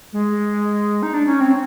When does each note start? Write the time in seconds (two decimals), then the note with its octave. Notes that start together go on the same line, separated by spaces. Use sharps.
0.13 G#3
1.03 D#4
1.14 D4
1.26 C#4
1.41 C4